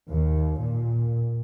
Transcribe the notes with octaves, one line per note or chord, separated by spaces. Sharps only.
D#2
A#2